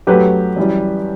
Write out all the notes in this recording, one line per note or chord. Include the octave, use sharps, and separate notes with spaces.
F#2 F#3 A3 G4 B4
F#2 E3 G3